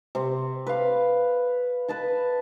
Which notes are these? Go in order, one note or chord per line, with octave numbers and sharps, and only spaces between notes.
C3 C4
B4 F5
B4 D#5 A5 B5